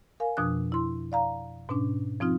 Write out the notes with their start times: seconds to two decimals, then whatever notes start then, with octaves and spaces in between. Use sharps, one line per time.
0.20 A#4 F5 G#5
0.37 F2 B2 F3 D4 D#6 F#6
0.72 E4 C6
1.12 D5 F5 A#5
1.69 G#2 B2 C#4 D4
2.20 F3 C4 D#4 F4